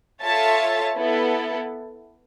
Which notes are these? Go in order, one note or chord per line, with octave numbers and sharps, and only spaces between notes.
F4 A4 C#5 E5 A5
B3 E4 A4